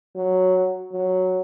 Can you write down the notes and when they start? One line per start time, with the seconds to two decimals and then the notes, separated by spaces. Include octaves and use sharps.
0.16 F#3
0.92 F#3